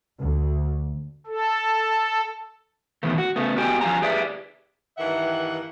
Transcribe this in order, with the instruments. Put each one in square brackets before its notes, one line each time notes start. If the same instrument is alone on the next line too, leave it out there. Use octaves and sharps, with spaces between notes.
[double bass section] D2
[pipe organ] A4
[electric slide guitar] B2 D#3 E3 A3
F#4
C#3 A3 B3
B3 F#4 G4 D#5 G5 G#5
F3 F5 G#5 A#5
G4 G#4 B4 D5 E5
[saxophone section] G2 D#3 E3 A#3 E5 F#5